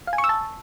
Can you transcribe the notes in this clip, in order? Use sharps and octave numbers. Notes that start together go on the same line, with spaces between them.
F5
G#5
C#6
E6
A5